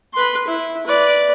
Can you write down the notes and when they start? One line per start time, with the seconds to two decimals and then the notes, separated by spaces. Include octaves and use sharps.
0.14 B4 C6
0.47 E4
0.87 B4 D5